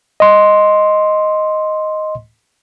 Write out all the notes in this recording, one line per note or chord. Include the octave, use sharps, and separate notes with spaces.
D#5 C6